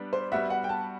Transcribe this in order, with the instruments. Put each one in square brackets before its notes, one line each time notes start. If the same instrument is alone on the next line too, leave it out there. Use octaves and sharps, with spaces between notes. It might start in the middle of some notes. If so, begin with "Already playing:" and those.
Already playing: [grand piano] G3 B3 D4
[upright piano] C5
[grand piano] G3 B3 F#4 [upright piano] E5
[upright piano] F#5
G5
A5